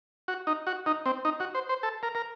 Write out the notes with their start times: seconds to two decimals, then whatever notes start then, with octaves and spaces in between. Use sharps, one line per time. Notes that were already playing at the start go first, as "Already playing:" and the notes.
0.28 F#4
0.47 D#4
0.67 F#4
0.86 D#4
1.06 C4
1.25 D#4
1.40 F#4
1.55 C5
1.69 C5
1.83 A4
2.03 A#4
2.15 A#4